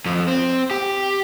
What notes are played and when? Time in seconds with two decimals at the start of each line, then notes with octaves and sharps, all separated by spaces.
0.06 F2
0.28 C4
0.71 G4